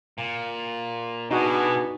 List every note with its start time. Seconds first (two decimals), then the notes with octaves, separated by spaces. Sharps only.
0.18 A#2
1.31 B2 B3 D4 D#4 F#4 G#4